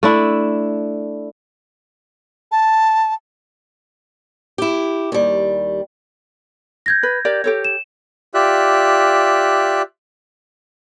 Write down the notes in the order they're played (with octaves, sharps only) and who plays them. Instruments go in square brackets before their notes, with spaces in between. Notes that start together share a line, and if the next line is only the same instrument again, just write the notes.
[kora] A3 D4 E4
[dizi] A5
[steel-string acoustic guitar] E4 G4
D#2 G3
[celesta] G6 G#6 A#6
[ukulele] B4
G4 A#4 D5
G4 A4 C#5
[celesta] E7
[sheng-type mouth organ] F4 G4 D5 E5 F#6